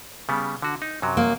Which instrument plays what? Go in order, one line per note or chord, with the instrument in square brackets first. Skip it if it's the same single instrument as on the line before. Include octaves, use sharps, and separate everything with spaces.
[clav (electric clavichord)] C#3 G3 B3
D3 F#4
D#4
F#2 C3 F#3
[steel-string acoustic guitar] A#3